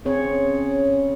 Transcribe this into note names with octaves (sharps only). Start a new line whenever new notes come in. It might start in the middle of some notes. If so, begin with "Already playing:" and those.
C#3 C4 C#4 C#5